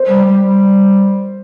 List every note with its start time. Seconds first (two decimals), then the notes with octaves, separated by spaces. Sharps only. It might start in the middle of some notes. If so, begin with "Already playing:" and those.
Already playing: C5
0.09 G3
0.25 G3
0.41 G3